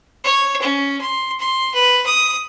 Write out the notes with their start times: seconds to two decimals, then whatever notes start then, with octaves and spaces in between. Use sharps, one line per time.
0.24 C#5
0.62 C#4
1.01 C6
1.40 C6
1.75 B4
2.06 D#6